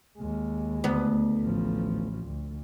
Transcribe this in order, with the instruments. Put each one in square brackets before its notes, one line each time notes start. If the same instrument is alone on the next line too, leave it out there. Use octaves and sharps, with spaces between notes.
[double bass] D#2 G#3
[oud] D2 B3
[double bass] A1 F3
D2